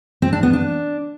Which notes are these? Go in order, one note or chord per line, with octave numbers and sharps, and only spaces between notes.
C4
D4
B3
D4